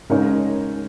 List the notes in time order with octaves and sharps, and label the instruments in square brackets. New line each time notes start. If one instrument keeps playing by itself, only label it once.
[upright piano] C#3 G#3 D#4 A#4 C#5